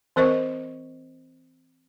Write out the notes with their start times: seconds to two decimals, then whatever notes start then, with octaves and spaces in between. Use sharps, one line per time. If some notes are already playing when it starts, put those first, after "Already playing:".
0.16 E3 C4 A#4 C5 D#5 C#6